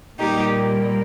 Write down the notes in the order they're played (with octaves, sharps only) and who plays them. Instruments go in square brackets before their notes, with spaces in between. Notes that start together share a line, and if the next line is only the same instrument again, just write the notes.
[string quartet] A#2 G3 A#3 D#4 G4